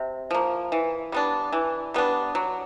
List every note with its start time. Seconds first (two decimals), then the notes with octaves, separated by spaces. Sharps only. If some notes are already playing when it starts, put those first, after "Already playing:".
Already playing: C3
0.31 F3 A#3
0.72 E3
1.12 G3 B3 D4
1.53 E3
1.94 G3 B3 D4
2.35 F#3